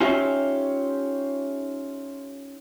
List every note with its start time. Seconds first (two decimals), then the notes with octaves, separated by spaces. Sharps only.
0.01 C#4 D#4 F4 G4 C#5 E5